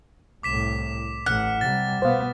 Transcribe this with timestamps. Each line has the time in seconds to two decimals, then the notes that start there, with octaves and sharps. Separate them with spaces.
0.43 C2 A2 D6 B6 E7
1.26 A1 F#5 F6
1.61 C3 G3 A6
2.02 B2 B3 C5 F5